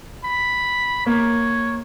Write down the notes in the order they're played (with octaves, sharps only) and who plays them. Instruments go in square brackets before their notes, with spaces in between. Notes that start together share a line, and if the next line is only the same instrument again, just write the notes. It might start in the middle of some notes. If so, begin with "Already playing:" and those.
[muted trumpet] B5
[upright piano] A#3 [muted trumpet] C#5